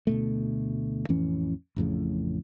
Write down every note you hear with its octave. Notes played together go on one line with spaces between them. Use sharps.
D2 B2 A3
A1 F2 E3 C#4
A1 F2 A2 C#3